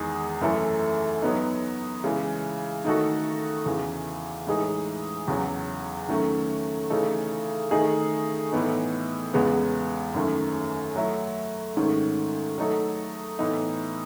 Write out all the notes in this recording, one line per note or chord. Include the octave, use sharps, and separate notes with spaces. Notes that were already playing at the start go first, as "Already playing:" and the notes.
Already playing: E2 D#3 G#3 D#4 G#4
F#2 E3 A3 E4 A4
F#3 B3 D#4
C#3 E3 G#3
D#3 A3 D#4 F#4 A4
E2 C#3 E3
A2 E3 G#3 D#4 G#4
E2 C#3 F#3
D#3 F#3 A3 C#4
C#3 E3 A3 D#4 A4
D#3 A3 D#4 G#4
A2 E3 B3 D#4
E2 C#3 G#3 B3
F#2 D#3 A3 C#4
F#3 A3 E4
G#2 D#3 A3 C#4
F#3 A3 D#4 A4
A2 E3 B3 D#4